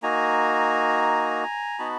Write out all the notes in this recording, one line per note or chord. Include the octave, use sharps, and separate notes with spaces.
A#3 D#4 F#4 G#5 A#5
B3 D#4 F#4 A5 B5